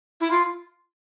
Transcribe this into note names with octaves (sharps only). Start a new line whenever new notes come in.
E4
F4